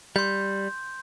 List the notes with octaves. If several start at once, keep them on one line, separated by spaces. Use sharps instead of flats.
G3 C6 G6